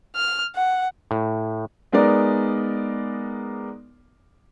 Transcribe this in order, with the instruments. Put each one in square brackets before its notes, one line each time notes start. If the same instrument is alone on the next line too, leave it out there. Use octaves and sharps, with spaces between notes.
[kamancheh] F6
F#5
[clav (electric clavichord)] A2
[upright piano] G#3 B3 D#4 A#4 D5